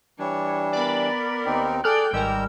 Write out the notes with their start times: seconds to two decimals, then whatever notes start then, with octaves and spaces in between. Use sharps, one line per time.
0.19 E3 G3 D4 C#5
0.73 B3 A#4 D5 B5
1.46 D#2 C4 D#4
1.84 G#4 A4 D5 G5 F6 F#6
2.13 G#1 D#3 G3 G#3 A#4 E6 G6